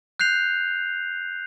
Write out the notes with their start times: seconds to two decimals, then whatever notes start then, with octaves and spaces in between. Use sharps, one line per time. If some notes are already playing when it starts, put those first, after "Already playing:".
0.20 F#6 G6 C7 F7